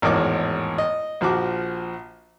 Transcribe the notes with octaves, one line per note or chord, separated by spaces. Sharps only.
G#1 E2 A2 A#4 D#5 D6
D#5
A#1 F3 F#4 D6